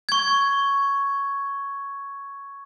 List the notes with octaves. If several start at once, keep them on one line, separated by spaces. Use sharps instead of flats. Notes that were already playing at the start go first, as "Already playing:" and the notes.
C#6 G#6